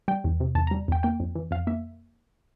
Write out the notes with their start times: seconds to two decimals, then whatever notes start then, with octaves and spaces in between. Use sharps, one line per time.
0.08 G3 G5
0.24 E2
0.40 C3
0.55 E2 A5
0.67 G3 A#5
0.88 E2 G5
1.03 A#3 G5
1.20 F2
1.35 E3
1.51 F2 F5
1.67 A#3 E5